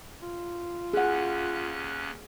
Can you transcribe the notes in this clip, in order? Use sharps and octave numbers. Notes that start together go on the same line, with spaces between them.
F4
D#2 C#4 G#4 F#5 F#6